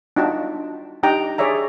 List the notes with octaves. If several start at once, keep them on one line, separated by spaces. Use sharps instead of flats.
D4 D#4 F4 F#4 G5 A5
D4 D#4 G4 G5 A#5
G#4 C#5 D5 E5 A#5